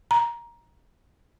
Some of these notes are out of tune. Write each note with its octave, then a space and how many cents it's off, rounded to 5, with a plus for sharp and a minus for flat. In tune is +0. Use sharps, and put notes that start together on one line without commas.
A#5 +15